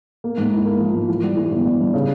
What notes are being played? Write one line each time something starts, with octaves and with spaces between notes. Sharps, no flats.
A#3
G#2
E4
A#3
F3
G#2
E3
G3
E3
G1
G3
G2
C#3